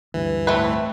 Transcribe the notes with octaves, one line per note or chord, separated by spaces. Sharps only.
D2 G2 E3
A2 A3 C4 B4